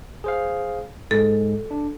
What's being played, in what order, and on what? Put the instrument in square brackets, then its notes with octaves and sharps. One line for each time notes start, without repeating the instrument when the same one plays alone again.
[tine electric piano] G#4 C5 F5
[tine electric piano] G#2 G#3 [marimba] A4
[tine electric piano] D4